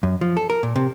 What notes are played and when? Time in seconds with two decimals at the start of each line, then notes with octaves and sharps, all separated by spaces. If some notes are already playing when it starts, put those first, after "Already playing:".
0.03 F#2
0.21 F3
0.37 A4
0.50 A#4
0.63 A#2
0.76 C3